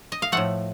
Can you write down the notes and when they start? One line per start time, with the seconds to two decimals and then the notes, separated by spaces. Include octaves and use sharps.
0.12 D#5
0.22 F5
0.32 A2 F3 A3 F#5